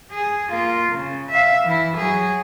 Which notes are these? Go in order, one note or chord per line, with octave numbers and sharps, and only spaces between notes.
G#4
A#3 F4
C#3
E5 F5
E3 E4
F#3 G#4